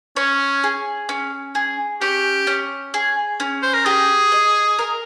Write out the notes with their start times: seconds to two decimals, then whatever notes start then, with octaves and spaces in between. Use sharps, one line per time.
0.16 C#4 C#5
0.64 G#4
1.09 C#4
1.55 G#4
2.01 C#4 G4
2.47 C#4
2.94 G#4
3.40 C#4
3.62 C5
3.74 A#4
3.85 G4 G#4
4.32 D#5
4.79 A#4